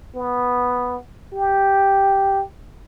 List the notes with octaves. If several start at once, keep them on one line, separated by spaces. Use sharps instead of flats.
B3
G4